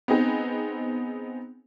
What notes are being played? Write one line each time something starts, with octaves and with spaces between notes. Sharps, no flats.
B3 C4 D#4 G#4